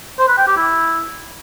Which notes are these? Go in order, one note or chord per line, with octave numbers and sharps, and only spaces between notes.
C5
B4
G5
G4
E4